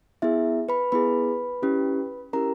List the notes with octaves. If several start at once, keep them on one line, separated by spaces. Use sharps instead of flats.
B3 E4 G#4 E5
B4 B5
B3 E4 G#4 B4 B5
C#4 E4 G4
C#4 E4 G4 A#4 A#5